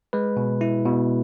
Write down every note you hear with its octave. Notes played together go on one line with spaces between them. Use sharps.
G#3 B4
B2
E4
B2